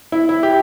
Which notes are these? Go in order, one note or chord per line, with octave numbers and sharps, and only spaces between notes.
E4
E4
G4